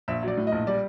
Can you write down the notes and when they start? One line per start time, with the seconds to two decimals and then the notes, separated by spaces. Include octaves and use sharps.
0.08 A#1 E5
0.23 F#3
0.28 D5
0.37 A2
0.47 D#5
0.52 A#1
0.67 G3 D5